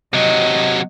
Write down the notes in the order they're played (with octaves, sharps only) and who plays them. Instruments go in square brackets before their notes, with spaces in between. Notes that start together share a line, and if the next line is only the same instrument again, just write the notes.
[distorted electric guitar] C3 F#3 [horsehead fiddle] D#5